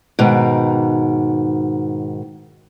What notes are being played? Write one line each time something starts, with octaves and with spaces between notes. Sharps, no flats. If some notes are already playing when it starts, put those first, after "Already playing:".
G#2 B2 D#3